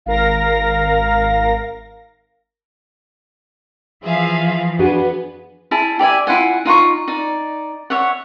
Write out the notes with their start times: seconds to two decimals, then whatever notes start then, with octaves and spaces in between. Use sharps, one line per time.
0.06 G#1 A#4 F5 A#6
4.04 E3 F3 G#4 E5 F5
4.79 B3 D4 F#4 G#4
5.71 E4 G#4 A5
5.99 G4 D5 E5 G#5
6.27 E4 F4 F#5 G#5
6.65 D#4 F4 F#5 C#6
7.08 D#4 D5
7.90 C#5 E5 F#5